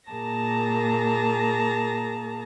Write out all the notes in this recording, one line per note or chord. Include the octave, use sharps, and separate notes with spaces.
A#2 A#3 G#4 A5 A#5 A#6